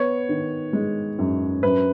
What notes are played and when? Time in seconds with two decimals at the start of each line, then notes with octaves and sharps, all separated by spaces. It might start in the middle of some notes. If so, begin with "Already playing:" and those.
Already playing: B3 C#5
0.29 D#3
0.73 G#3
1.19 F#2
1.63 F#2 B4